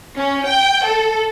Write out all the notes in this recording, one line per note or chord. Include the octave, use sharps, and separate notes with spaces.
C#4
G5
A4